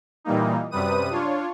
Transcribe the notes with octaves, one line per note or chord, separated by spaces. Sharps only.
A#2 E3 G3 A#3 D#4
F#2 C3 G3 B4 D#6 D#7
D4 F4 C#5